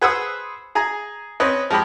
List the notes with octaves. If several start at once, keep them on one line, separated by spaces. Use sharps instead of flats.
G#4 B4 C5 F#5 D#6 E6
G#4 G#5 A#5
C4 C#4 B4 D#5
F3 G#3 G4 D#5 B5